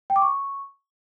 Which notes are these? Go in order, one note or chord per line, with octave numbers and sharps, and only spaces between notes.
G5
D6
C#6